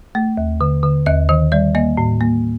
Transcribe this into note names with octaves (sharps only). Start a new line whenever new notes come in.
A3
D#2
D3
D3
D#2 D#5
D#3 D#5
G3 D5
A#3 D#5
A2
A#3